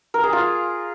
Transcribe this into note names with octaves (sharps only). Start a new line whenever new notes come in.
A#4
G#4
F4